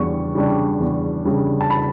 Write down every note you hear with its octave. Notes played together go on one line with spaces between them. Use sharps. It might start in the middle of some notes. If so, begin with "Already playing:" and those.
Already playing: E2 C#3 G3 D4 C#6
C#3 G3 D4
E2
C#3 G3 D4
A5
B5